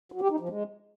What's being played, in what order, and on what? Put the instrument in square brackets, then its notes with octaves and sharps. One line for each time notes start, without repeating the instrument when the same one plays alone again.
[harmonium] F#3
G4
D#4
F3
G#3